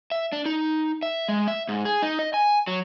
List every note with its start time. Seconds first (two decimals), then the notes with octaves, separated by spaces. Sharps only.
0.11 E5
0.32 D4
0.46 D#4
1.03 E5
1.28 G#3
1.48 E5
1.69 G#2
1.85 G#4
2.02 D#4
2.19 D#5
2.34 G#5
2.67 F#3